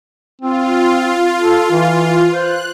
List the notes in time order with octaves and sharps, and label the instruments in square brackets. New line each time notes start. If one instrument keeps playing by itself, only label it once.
[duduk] C4 [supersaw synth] F4
[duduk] A4
E3
[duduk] C5 [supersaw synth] F#6